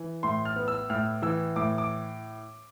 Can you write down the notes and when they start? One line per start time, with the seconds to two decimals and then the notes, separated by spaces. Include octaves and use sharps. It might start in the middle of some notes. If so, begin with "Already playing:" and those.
Already playing: E3
0.23 A2 C6
0.45 F6
0.56 B3
0.68 E6
0.90 A2 F6
1.22 E3 E6
1.56 A2 D6
1.78 D6